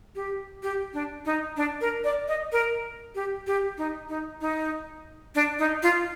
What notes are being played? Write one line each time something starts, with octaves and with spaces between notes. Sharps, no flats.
G4
G4
D4
D#4
D4
A#4
D5
D#5
A#4
G4
G4
D#4
D#4
D#4
D4
D#4
F4